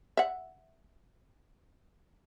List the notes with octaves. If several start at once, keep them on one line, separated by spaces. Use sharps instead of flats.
E5 F#5